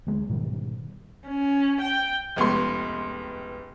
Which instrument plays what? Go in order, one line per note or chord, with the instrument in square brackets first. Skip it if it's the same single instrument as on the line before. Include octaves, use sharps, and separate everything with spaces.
[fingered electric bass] D2 G#3
G#2 B2 D#3 G3
[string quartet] C#4
G5
[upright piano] F1 C#2 B3 C6